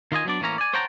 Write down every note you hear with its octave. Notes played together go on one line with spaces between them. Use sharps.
D#3 F4 D#5 G#5
F#3 B3 D4 D5
A2 E3 A#3 C#4 A#5
D5 G#5
C5 C#5 F#5 G5 A5 A#5